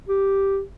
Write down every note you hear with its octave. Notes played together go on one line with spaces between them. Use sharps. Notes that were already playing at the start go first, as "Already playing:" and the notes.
G4